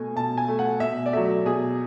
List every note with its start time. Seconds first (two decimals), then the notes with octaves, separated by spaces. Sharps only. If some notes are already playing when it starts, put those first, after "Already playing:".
Already playing: B2 A3 G#5
0.16 B2 A5
0.38 G#5
0.48 A3
0.59 F#5
0.80 B2 E5
1.06 D5
1.13 F#3 A3 E5
1.45 B2 G#4